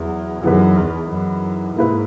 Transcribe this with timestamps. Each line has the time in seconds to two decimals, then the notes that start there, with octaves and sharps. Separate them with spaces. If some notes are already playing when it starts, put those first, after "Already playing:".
Already playing: E2 F#3
0.43 F#2 E3 B3 D#4 G#4 B4
0.76 E2
1.10 F#2
1.76 G#2 A#3 E4 B4